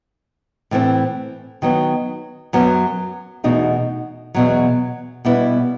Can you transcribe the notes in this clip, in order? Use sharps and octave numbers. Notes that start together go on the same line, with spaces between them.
A2 E3 A3 C4
D#3 F#3 B3
F#2 F#3 B3
E2 B2 A3 D#4 F#4
E2 B2 F#3
B2 G3 B3 E4